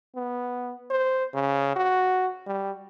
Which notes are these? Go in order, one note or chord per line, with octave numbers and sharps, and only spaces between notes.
B3
C5
C#3
F#4
G3